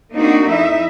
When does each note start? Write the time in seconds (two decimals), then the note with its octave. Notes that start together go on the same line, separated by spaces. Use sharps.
0.14 A#3 C4 D4 D#4 F#4
0.47 F2 D#4 E4 D#5 E5